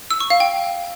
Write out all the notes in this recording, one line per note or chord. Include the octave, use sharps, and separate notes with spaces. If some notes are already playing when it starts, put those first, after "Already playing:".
E6
C#6
F5
G5